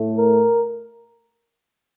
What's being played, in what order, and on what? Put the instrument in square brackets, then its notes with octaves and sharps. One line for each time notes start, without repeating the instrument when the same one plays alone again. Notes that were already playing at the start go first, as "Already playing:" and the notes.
Already playing: [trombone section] A2 A3
A#4